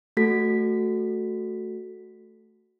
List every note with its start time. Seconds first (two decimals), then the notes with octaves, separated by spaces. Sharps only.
0.17 A3 F#4 A4 B6